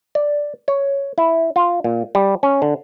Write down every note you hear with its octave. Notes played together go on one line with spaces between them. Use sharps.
D5
C#5
E4
F4
A#2
G3
C#4
D3